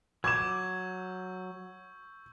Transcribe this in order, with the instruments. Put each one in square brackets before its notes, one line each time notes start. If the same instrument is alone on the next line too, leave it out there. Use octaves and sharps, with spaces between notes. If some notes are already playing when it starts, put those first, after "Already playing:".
[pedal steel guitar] F#3 D6 [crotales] C#6 E6 G6 [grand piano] G#6 E7